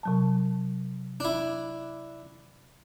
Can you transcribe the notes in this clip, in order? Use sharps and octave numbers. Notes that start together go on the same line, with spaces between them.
C3 F#3 A5
D4 E4